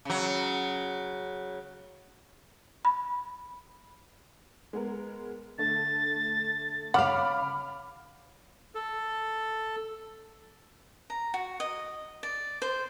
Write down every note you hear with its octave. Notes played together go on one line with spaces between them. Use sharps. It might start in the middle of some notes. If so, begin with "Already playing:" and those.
C#3 F#3
B5
G#3 B3 A#4
D3 A3 A6
C#3 F5 F#5 B5 D6 F6
A4
A#5
F#4
D#5
D5
C5